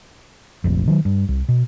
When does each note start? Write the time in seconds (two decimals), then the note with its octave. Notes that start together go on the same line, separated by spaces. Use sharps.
0.64 F1 A#1 F2
0.87 D#3 F#3
1.05 G2
1.29 C2
1.48 B2